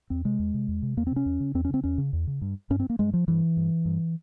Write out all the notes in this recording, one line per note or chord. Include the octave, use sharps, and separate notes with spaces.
E2 C4
C3 G#3
E2
C3
E2
C3
E2 A#3
C4
C3
C#4
E2
C#3
E2 C4
C#4
C#3 C4
E2 C#4
C#3
E2
C#3
G2
G2 C#4
C4
A#3
G2 G#3
F3
G2 E3
G2
G2